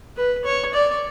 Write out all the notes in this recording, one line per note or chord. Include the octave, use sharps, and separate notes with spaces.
B4
C#5
D5